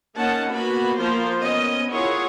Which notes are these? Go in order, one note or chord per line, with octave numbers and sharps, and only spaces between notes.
A#3 C#4 D#4 F#5 A5
A#3 B3 F#4 B4 B5
F3 A#3 F4 A#4 C5
B3 C#4 D#5
E4 F4 G#4 A#4 C#5 F#5